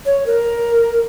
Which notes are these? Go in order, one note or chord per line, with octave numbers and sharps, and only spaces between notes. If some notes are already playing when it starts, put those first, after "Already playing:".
C#5
A#4